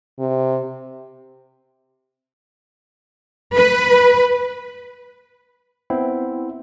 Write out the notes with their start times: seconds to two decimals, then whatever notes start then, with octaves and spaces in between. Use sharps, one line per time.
0.19 C3
3.55 B4
5.90 B3 C4 E4